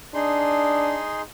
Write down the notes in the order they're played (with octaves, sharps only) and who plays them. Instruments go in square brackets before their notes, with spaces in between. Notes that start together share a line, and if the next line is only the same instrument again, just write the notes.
[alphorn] D4 [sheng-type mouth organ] D#4 G#4 C6